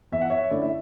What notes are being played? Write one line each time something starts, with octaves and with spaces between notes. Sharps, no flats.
E2 E5
F#5
C#5 E5
D3 A3 C#4 E4 D5
E5